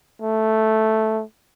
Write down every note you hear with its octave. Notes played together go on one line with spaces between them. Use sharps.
A3